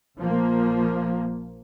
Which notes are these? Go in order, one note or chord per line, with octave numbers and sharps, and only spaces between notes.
A#1 F3 A#3